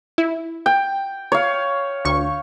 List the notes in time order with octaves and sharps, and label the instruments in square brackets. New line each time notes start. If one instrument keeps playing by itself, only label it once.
[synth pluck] E4
[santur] G5
C#5 F5
[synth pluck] D2 C#6